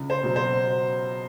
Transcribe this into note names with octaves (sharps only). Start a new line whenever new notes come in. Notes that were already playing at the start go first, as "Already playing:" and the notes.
Already playing: C#2
C5
B2 F#3
C5